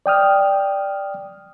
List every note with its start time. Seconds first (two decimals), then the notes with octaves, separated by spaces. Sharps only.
0.06 D5 G5 D#6 F6